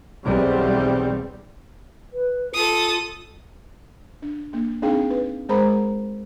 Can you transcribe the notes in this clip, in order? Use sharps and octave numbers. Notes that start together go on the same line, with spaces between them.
B1 E2 G3 C4
B4
F4 A4 D#6
D4
A#3 D4
C4 D4 D#4 G#4 F5 G5
B4
G#3 G#4 A#4 C5 A#5 B5